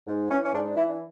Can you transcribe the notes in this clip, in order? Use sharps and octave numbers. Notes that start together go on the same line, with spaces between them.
G#2
E3 C#4
C#4
G#2 D4
D4
E3 E4
D4